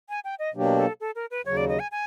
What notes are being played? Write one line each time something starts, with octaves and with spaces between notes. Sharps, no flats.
G#5
G5
D#5
B2 F#3 A#3 D4 G4
A4
A4
A#4
B4
D#2 C#3 F#3 C#5
D5
D#5
G#5
G#5